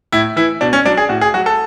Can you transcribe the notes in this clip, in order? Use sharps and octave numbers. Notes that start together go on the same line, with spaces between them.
A2 E4
E3 E4
B2 D4
C#4
F#3 D4
G#4
A2 F#4
G#4
F#3 F#4
A4